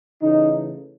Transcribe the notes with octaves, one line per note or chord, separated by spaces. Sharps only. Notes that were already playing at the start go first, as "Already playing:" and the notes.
C#3 E3 A3 D#4